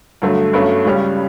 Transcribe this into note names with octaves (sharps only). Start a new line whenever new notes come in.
G2 D3 F#3 A3
G1 G2 F#3 A3 C#4
C#2 C#3 G3 C#4